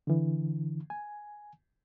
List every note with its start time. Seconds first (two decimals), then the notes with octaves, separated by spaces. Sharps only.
0.07 D3 E3
0.90 G#5